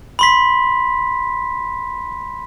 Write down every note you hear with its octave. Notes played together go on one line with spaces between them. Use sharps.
B5 C6 B6